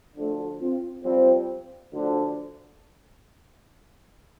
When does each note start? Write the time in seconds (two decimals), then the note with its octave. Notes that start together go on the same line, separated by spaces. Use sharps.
0.16 D2 D3 F3 A3 D4
0.60 C4 F4
1.03 F2 F3 G3 C4
1.91 D2 D3 F3